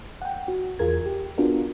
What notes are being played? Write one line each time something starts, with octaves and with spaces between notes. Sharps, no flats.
F#5 G5
F#4
E2 F4 G#4 A#4 G#6
G4
B3 D4 F4 F#4 G#4 A#4